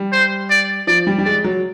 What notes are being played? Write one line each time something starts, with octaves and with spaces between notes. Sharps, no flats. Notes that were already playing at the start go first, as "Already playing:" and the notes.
Already playing: G3
C5
D5
F3 D5
G3
G3
G#3 D5
F#3